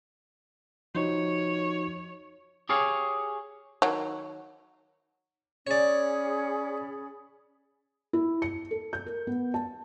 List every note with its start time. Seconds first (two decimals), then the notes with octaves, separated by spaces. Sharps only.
0.95 F3 D#4 F#4 C#5
2.69 G4 G#4 C#5 F5
3.82 D#3 F#3
5.67 C#4 G#4 C#5 D5 B5
8.13 E4
8.42 C#7
8.71 A4
8.93 G6
9.06 A#4
9.27 B3
9.54 A5